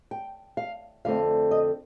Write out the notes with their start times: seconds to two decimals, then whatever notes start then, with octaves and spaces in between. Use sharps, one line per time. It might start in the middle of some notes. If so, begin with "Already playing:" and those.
0.11 G5
0.57 F5
1.05 F2 D3 A3 C4 F5
1.51 D#5